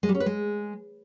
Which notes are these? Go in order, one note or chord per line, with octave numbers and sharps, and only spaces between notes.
G#3
G3
C#4
B4
G#3